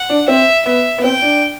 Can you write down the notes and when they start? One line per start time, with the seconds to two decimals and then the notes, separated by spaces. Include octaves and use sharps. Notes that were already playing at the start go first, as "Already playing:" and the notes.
Already playing: F#5
0.10 D4
0.28 C4 E5
0.66 B3 E5
0.98 B3
1.03 C4 G5
1.22 D4